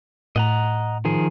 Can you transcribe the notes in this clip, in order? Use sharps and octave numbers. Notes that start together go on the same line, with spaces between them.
A2 D#5 F#5 A#5
D#3 F3 G#4